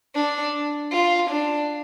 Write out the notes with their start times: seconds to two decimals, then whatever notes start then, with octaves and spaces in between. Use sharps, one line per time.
0.15 D4
0.93 F4
1.30 D4